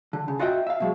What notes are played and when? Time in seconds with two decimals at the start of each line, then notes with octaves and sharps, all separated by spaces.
0.13 D3
0.28 C#3
0.40 F4 F#4 D#5 E5 F#5 G5
0.67 E5 F5
0.80 B2 F#3 G#3